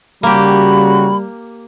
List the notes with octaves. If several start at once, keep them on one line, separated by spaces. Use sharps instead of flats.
C#3 G3 A#3 F#4 G4 B5